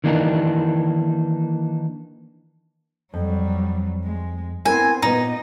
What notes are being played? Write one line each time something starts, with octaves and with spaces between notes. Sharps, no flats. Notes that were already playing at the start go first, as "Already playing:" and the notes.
D#3 E3 A#3 D4 D#4
F2 F#3 G3
G#3
B3 C4 E4 A#4 G#5
A#2 B3 D#4 D#5